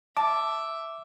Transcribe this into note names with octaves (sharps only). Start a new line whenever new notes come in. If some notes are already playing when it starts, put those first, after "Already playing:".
E5 A5 D6